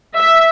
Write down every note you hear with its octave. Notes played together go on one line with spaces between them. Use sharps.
E5